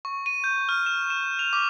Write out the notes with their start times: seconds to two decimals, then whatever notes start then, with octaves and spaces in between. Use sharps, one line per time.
0.05 C#6
0.26 D#7
0.44 G6
0.69 F6
0.86 E7
1.10 E7
1.39 F7
1.53 D6